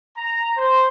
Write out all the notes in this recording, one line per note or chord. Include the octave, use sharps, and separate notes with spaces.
A#5
C5